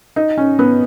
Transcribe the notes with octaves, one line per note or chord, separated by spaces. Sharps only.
D#4
C#4
B3